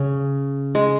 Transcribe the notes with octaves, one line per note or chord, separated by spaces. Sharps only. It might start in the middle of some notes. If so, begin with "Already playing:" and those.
Already playing: C#3 C#4
G#3